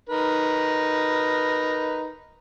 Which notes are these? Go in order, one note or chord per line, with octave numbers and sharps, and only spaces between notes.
D#4 A#4 B4